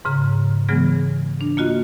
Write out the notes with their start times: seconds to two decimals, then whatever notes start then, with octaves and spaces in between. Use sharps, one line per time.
0.05 G#2 C#3 A#5
0.69 C#3 E3 F#3 G#3 B3 G#4
1.41 D4
1.57 A#3 F4 F#4 D#5